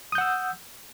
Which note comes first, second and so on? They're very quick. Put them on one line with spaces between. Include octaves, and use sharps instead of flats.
D#6 G6 F#5 E6